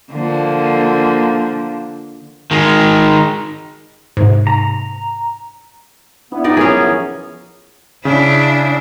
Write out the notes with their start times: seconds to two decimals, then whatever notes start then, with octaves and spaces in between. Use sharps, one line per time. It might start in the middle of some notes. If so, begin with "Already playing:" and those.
0.13 D3 F3 A#3
2.51 D#3 G#3
4.17 G#2 C3
4.47 A#5
6.32 B3 D4 E4
6.44 D#4 F4 G4 B4 D5
6.57 F3 C#4 E4 G#4 A#4
8.05 C#3 D4 E4